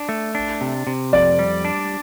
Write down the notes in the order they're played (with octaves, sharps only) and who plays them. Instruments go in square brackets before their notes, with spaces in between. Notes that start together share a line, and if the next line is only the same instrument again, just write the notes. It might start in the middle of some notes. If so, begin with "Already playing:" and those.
Already playing: [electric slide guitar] D4
A3
D4
C3
C3
[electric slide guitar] F2 [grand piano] D5
[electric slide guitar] G3
D4